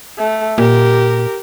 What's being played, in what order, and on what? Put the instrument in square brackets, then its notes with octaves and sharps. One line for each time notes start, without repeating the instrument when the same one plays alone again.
[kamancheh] A3
[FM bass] A#2 [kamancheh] G4 A#4